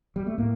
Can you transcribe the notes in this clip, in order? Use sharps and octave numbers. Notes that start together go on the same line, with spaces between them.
G3
A3
A2 A#3